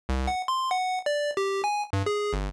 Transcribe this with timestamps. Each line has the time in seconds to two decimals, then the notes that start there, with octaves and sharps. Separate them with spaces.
0.09 C2
0.27 F#5
0.48 C6
0.71 F#5
1.06 D5
1.37 G4
1.64 G#5
1.93 G2
2.06 G#4
2.33 G1